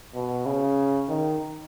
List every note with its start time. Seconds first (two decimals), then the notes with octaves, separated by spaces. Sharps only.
0.15 B2
0.46 C#3
1.09 D#3